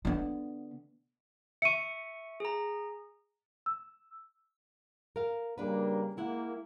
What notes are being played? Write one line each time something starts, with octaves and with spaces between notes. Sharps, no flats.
D3 B3
E5 C#6 C#7 D#7
G#4 A#5
E6
A#4 F5
C#3 G3 A#3 D4 B4
G#3 A#3 E4 F#5